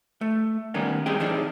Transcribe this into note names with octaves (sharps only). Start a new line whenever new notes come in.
A3
D#3 G3 A#3 B3 C#4 D#4
D#2 G3 C4 D#4 G#4 G5
E3 C4 D4 D#4 G#4